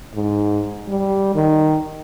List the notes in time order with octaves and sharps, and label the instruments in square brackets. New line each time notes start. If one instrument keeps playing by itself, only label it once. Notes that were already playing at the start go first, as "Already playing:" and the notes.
[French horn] G#2
G3
D#3